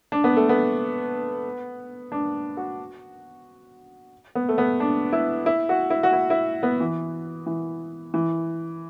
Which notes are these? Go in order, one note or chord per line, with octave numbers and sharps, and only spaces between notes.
D4
B3
A3
B3
D4
F#4
B3
A3
B3
D4
E4
E4
F#4
E4
F#4
E4
E4
B3
E3
E3
E3